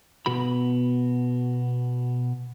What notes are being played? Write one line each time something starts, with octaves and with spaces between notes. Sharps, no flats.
B2 B3 F#4 B5